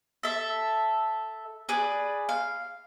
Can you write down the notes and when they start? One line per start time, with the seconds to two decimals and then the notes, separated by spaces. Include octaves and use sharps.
0.23 A4 E5
1.69 G#4 B4 D5
2.29 F5